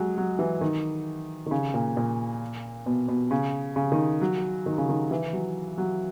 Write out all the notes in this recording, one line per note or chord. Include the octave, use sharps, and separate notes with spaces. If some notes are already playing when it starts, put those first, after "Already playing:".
Already playing: F#3 G#3
F#3
E3
D#3
D#3
C#3
A#2
A#2
B2
B2
C#3
C#3
D#3
F#3
D#3
C#3
D#3
E3
F#3
F#3